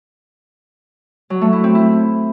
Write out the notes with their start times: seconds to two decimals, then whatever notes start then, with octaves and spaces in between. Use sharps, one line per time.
1.30 F#3
1.41 A3
1.53 E4
1.64 C4
1.75 E4